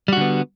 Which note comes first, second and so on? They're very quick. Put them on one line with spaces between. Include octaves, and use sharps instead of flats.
G3 F#4 D3 B3